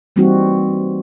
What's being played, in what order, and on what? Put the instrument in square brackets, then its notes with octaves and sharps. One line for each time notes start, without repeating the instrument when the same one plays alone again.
[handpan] E3 G3 A#3 C4 D#4 F#4